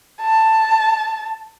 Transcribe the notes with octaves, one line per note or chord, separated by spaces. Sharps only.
A5